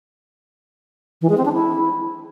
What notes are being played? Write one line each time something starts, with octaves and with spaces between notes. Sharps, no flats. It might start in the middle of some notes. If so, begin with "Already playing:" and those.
E3
G#3
C4
D4
E4